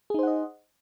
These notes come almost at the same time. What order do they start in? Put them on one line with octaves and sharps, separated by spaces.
G#4 D#4 C5 F#5 D#5